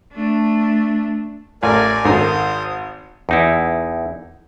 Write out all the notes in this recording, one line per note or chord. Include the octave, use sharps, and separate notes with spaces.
A3 D4
A1 A#4 D5 G#5
G#1 D#3 C5 A#5 D#6
E2 D#4 E4